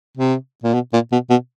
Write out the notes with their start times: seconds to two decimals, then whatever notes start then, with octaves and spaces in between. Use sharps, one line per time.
0.17 C3
0.64 A#2
0.74 B2
0.93 A#2
1.12 B2
1.30 B2